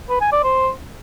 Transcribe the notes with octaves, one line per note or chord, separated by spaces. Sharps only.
B4
G#5
D5
C5